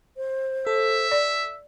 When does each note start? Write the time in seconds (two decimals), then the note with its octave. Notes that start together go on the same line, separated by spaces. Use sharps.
0.17 C5
0.67 A4 E5
1.11 D5